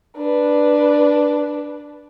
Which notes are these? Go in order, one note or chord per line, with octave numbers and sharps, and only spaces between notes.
D4 B4